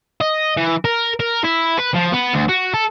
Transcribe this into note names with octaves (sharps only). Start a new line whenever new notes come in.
D#5
E3
A#4
A#4
E4
B4
F3
B3
D2
F#4
A4